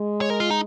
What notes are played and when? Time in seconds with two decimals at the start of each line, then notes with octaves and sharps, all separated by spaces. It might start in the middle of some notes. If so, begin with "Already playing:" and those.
Already playing: G#3
0.21 C#5
0.30 A#4
0.40 F4
0.50 D#4